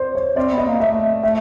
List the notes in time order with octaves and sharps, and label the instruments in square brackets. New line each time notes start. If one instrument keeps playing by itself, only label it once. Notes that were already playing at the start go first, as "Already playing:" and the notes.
Already playing: [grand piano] C5 D5
C#5
[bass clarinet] C4 [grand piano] D5
[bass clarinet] B3
[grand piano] D#5
[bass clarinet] A#3
[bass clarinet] A3 [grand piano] E5
[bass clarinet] A3 [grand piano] E5